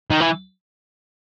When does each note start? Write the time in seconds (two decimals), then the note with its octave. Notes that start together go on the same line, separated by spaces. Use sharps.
0.11 D#3
0.21 E3